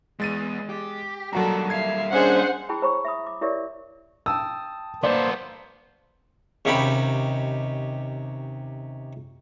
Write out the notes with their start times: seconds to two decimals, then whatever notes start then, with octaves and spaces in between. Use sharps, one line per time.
0.20 E2 G#3 A6 D#7
0.69 G4
1.33 F#3 G3 A#3 D4 F#4 A4 A#5
1.70 E5 F5 G#6 C7
2.13 C#4 D4 G#4 C5 D#5 F#5
2.69 E4 G#4 G5 A5 B5
2.82 C5 C#5 A#5 B5 C#6
3.05 E5 B5 D#6
3.27 D6
3.42 E4 G4 A#4 C#5 D5 E5
4.26 G5 A5 D#6 E6
5.03 A#3 B3 A4 C5 D5
6.65 D#2 C3 C#4 D#4 G4 B5